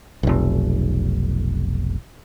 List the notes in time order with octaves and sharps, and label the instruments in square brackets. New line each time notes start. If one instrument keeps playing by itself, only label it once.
[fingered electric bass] F1 B1